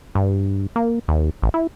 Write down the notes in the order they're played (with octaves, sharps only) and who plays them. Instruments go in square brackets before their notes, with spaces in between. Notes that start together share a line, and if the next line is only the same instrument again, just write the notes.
[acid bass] G2
A#3
D#2
A1
E4